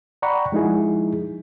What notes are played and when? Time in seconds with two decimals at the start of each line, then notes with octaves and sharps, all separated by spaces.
0.22 D5 F#5 G5 A#5 B5 C#6
0.52 F3 G#3 D#4 E4 G#4